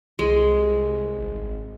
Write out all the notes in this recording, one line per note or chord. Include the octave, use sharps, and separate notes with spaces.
C2 G#3
G#1